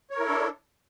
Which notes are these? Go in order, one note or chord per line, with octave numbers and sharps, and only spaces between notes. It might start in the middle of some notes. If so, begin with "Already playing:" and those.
D4 E4 A4 A#4 C#5